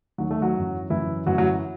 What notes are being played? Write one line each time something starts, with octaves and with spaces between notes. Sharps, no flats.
D#2 D#3 F#3 F#4
A3 A4
F#3 F#4
F#2 E3
F#2 E3 E4
F#2 E3 F#3 F#4
F#3 F#4